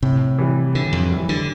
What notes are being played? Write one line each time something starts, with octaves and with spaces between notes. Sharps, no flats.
A2 C3
E3 G3
A2 D3
F2
E3 G3
D3